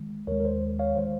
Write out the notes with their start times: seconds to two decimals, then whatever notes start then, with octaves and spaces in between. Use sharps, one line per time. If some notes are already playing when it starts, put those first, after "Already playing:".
Already playing: D#3 G#3
0.27 D#2 D#3 G#3 A#4 C#5
0.40 A#4
0.45 C5
0.79 C#5 F5
0.96 D#3 G#3 C5